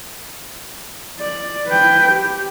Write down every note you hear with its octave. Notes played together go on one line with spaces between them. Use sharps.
D5
B4 G5
G4